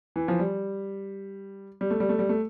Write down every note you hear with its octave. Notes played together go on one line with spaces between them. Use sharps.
E3
F3
G3
G3
A3
G3
A3
G3
A3